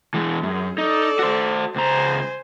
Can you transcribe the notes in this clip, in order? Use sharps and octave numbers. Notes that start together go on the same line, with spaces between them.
E3 G#3
F#2 G#4
D#4 A4 D5
F#4 C5
C#2 C5 G#5 A#5